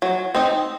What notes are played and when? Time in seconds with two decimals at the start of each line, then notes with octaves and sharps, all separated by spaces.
0.02 F#3
0.35 C4 D#4